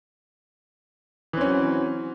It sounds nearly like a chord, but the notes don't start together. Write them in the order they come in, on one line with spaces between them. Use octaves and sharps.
E3 C4 C#4 F#3